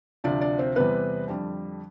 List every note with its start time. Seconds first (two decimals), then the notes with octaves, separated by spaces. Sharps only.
0.24 D2 C3 F3 D4 D5
0.41 D4 D5
0.59 C4 C5
0.76 E2 C3 G3 B3 C4 B4
1.28 F2 D3 G3